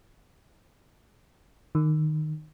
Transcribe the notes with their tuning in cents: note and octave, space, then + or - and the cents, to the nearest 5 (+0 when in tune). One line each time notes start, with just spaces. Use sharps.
D#3 -15